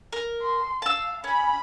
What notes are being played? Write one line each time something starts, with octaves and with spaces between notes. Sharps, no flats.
A#4
C6
F5 A5 E6
C#4 B5